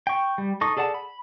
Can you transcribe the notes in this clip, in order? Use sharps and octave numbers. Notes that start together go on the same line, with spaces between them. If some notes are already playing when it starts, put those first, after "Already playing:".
G5 C#6
G3
D#4 A4 C#6 D#6
G#4 A4 D5 F#5 A5
B5